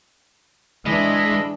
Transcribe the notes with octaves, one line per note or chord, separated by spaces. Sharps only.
E3 G#3 D4 D#5 E5 B5